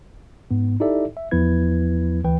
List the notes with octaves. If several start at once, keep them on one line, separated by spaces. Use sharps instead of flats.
G#2 B3
D#4 E4 G4 A4 D5 E5
E5
E2 F3 B3 E4 B4 G#6
D2 E3 B4 G5